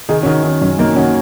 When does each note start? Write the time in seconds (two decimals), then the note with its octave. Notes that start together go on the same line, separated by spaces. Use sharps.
0.09 D#3 D#4 G#4
0.23 C#4 F#4
0.26 D#3
0.44 D#3 C#4
0.61 F#2 C#4
0.78 F#2 A#3 D#4
0.95 D#3 C#4 F#4